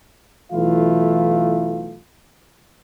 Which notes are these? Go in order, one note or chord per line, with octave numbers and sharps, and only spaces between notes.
B1 E3 A3 E4 F4 F5